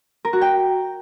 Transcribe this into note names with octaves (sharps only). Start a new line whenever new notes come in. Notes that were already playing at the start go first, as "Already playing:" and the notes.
A#4
F#4
G5